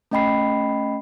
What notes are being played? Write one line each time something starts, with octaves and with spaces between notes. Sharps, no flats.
A3 C#4 D#5 G5 B5 C7